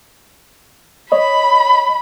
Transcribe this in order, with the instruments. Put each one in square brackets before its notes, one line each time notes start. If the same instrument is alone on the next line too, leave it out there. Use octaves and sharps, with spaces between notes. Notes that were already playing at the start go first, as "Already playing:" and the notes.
[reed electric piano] C#5 D#5 [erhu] B5